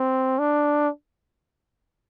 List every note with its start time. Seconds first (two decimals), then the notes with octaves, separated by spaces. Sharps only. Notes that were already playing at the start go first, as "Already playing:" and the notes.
Already playing: C4
0.39 D4